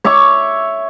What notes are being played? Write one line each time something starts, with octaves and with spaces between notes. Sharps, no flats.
C#5 E5 C#6 D6